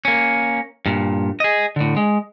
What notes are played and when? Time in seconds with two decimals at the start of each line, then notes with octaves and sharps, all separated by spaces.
0.05 A#3 C#4
0.86 G2 A#2
1.40 G#4 D#5
1.76 A2 D3
1.97 G#3